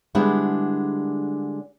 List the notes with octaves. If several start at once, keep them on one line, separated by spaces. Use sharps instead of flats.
D3 G3 G#3 B3 D4 E4